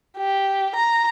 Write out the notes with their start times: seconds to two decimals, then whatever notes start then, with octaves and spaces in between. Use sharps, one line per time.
0.17 G4
0.75 A#5